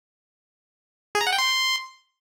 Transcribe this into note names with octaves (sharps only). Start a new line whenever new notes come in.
G#4
A#5
F#5
G5
C6